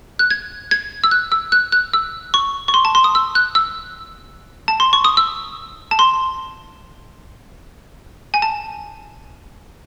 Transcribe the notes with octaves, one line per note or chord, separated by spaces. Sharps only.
F#6
G#6
G#6
E6
F#6
E6
F#6
F#6
E6
C#6
C#6
C6
A5
C6
D#6
E6
F#6
E6
A5
C6
C#6
D#6
E6
A5
C6
G#5
A5